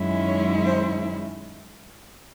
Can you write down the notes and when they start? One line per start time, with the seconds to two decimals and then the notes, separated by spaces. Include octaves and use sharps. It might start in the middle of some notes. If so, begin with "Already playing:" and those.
Already playing: F#2 D#3 G#3 C#4 E4
0.26 C#5
0.65 C5